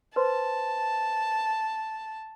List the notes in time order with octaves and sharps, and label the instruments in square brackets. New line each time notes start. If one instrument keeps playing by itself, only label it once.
[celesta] B4 C5 C6 [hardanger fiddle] A5